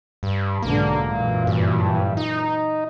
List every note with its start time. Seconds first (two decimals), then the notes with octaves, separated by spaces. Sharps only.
0.23 G2
0.62 B1 G#2 D3 A#3
1.06 F#2 A#2 E3
1.47 G2
2.17 D#4